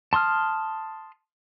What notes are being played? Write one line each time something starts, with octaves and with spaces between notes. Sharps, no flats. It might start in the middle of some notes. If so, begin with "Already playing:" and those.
A5 C6 D#6 F6